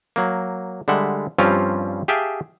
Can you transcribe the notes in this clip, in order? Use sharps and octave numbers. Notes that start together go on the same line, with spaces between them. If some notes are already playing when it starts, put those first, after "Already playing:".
F#3 A#3
D3 G3 G#3 E5 F#5
G2 F3 G3 C4 C#4 F4
G4 G#4 E5 F5 G5 A5